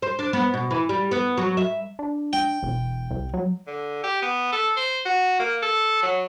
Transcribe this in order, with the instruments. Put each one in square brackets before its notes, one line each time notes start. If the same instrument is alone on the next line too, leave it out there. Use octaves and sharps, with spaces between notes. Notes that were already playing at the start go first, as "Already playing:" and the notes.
[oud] C5
D4
B3
B2
E3
G3
B3
F#3
E5
[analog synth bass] D4
[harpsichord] G5
[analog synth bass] E1
C2
F#3
[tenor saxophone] D3
G4
B3
A4
C5
F#4
A#3
A4
F#3